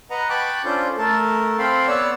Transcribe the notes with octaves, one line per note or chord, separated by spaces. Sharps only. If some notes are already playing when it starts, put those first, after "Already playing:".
B4 D#5 F#5 A#5
G5 A5 B5 C#6 D6 F#6
C#4 D4 F4 A4 C5 G6
A3 A4 A#4 A5
C4 A4 F5 G5 B5 C6
B3 C#5 D5 F#5 E6